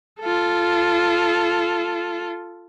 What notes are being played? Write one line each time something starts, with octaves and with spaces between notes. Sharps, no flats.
F4 A4